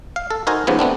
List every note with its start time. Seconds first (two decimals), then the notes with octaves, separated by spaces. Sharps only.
0.16 F5
0.31 A4
0.47 D#4 F#4 A#4 C5 G#5
0.67 D#2 G#2 C#3 F3 B3
0.79 A3 B3 C4 D4